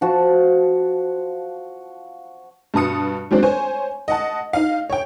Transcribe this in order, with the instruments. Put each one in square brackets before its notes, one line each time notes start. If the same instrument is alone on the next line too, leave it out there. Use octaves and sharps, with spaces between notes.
[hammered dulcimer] F3 F#4 A5
[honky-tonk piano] G2 B2 A5 D#6 C#7
F#3 G#3 C4 D4 C5
C5 C#5 G#5
D#5 F#5 A5
D#4 F5
C#5 G5